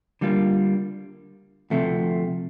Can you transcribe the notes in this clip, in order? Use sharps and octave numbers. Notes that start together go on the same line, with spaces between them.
D3 G3 A#3 F4
D2 C3 F3 A3